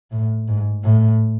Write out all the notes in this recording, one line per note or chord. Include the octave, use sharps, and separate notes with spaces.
A2
G#2
A2